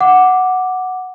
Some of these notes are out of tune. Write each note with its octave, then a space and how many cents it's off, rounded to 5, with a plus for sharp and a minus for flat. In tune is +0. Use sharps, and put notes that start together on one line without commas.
F#5 +0 D6 +0